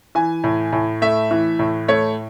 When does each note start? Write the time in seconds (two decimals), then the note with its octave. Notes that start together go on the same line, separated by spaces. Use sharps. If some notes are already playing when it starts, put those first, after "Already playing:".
0.15 E3 G#5
0.44 A2
0.73 A2
1.02 A3 E5
1.31 E3
1.59 A2
1.88 A3 C#5